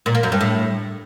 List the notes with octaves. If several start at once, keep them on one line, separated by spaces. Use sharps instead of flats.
A#2
A#3
F#2
G2
A2